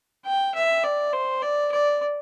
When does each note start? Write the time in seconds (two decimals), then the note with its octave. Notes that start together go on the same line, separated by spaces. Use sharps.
0.25 G5
0.54 E5
0.84 D5
1.13 C5
1.42 D5
1.71 D5